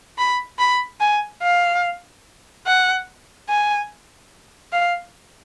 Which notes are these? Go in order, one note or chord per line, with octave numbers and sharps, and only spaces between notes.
B5
B5
G#5
F5
F#5
G#5
F5